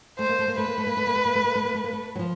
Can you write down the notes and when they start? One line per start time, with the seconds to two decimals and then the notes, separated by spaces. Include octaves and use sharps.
0.19 A3 C5
0.29 A#3
0.39 A3
0.48 A#3
0.58 A3 B4
0.68 A#3
0.78 A3
0.87 A#3
0.97 A3
1.07 A#3
1.16 A3
1.26 A#3
1.35 A3
1.44 A#3
1.55 A3
1.65 A#3
1.74 A3
1.84 A#3
1.93 A3
2.16 F#3
2.19 F3